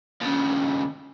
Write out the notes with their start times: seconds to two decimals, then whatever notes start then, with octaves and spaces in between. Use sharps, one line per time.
0.21 D#2 C#3